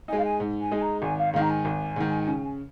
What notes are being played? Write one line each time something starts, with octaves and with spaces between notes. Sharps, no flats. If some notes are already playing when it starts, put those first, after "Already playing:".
G#3 D#4 G#5
F5
G#5
G#2
G#5
G#3 D#4 G#5
A#5
G#1 G#5
F5
G#2 D#3 F5
A#5
G#5
G#1
G#2 D#3
C#3